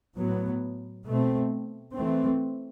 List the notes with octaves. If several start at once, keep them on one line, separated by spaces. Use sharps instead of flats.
A2 F#3 B3
B2 A3 C4
E3 A3 C4